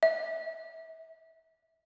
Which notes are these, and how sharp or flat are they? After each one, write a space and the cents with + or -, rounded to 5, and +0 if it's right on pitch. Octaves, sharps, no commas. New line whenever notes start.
E5 -30